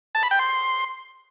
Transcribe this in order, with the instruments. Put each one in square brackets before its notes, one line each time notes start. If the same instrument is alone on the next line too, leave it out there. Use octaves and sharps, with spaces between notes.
[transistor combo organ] A5
B5
G5
C6